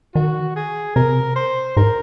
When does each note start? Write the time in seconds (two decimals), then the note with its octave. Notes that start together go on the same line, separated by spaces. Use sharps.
0.15 D#3 F#4
0.56 G#4
0.96 C3 A#4
1.36 C5
1.77 G#2 A#4